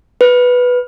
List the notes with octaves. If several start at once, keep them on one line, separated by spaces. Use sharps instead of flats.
B4